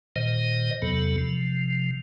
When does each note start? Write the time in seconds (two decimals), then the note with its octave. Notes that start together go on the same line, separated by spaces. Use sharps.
0.16 A#2 D#3 C5 D#5
0.82 E2 C3 F#3 B3 A4
1.18 C3 F3